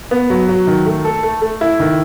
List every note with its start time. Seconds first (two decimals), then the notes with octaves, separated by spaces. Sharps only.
0.11 B3
0.30 F#3
0.49 F#3
0.67 D#3
0.86 A3
1.05 A4
1.23 A3
1.42 A3
1.61 E4
1.80 D#3